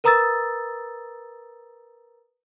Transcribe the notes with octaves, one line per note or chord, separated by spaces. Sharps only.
A#4 B4 A#5 D#6 E6 A6